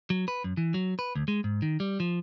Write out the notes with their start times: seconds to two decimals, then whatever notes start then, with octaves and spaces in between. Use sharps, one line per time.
0.10 F#3
0.28 B4
0.44 F#2
0.57 E3
0.74 F#3
0.99 B4
1.15 D2
1.28 G#3
1.44 G#2
1.62 D#3
1.80 G3
2.00 F3